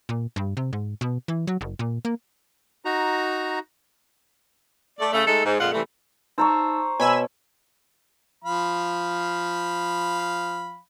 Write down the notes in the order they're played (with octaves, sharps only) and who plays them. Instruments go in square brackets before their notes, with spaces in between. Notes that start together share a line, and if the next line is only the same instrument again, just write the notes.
[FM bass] A#2
G2
C3
G#2
B2
E3
F#3
F#1
A#2
A#3
[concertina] D#4 F#4 A#5
[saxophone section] A3 D5
C#3 A3
G#3 A3 D#4 A4
G#2
F2 A#2 G#3 F4 F#5
C3 E3 G3 A3
[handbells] D#4 A5 E6 [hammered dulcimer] C5 A#5 C#6
[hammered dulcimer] B2 [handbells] C#5 [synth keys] G#5 B5 E6
[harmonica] F3 F5 B5